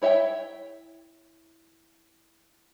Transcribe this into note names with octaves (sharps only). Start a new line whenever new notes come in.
E4 C#5 E5 F5 G5